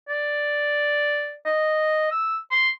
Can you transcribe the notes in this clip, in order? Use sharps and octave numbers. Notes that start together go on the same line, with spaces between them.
D5
D#5
E6
C6